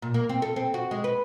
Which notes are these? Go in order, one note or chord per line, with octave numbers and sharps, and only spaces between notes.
A#2
A#3
C4
A4
C4
F#4
G#3
B4